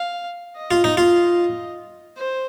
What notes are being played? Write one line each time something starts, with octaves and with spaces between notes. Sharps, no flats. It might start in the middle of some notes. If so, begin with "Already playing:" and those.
Already playing: F5
D#5
F4
D#4
F4
C5